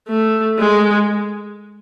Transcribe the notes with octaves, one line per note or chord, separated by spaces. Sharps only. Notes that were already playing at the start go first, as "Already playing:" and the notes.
A3
G#3